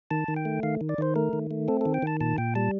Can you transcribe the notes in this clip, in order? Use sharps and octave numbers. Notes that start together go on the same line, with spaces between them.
D#3 A5
D#3
G5
A3
D#3 F5
D#3
D5
D#3 C5
A3 A#4
D#3
A3
C4 A4
D#3 A4
G5
D#3 A5
A#2 A5
A#2 G5
G3 A5